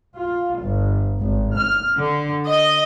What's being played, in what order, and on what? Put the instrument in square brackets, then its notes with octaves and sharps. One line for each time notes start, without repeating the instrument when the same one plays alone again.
[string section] F4
G1
G#1
F6
D3
D#5